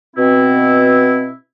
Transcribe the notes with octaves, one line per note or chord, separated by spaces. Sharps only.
B2 C4 E4